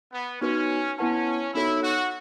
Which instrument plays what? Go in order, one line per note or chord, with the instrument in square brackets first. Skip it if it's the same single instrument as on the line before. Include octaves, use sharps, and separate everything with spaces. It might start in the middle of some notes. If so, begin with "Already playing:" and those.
[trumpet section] B3
[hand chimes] B3 D#4 F#4 B4 [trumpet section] C#4
[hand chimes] B3 E4 B4 F#5 A5 [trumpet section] C#4
[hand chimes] B3 D#4 F#4 A4 C#5 [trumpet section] E4
[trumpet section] F#4